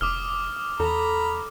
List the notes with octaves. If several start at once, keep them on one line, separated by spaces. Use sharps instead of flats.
F1 D6 D#6 F6
E2 A4 A#5 B5